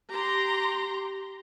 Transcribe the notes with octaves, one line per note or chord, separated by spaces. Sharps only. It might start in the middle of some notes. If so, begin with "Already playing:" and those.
G4 A#5 C6